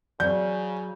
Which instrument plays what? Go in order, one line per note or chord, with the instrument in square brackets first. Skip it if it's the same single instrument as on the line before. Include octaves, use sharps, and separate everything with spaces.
[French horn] C#3 [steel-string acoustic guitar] F#3 [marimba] D5 [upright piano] G6